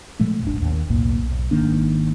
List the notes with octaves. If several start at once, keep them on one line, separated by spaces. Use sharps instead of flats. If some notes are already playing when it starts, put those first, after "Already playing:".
A#2 F3 G#3 A3
D#1 G#1 D4
D#2
B1 E2 A2 A#3
B1
G#1 D#3 A#3 D4